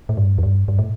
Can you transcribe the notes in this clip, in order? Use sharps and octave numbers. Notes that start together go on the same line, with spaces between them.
A2
G2
E2
G2
G2
A2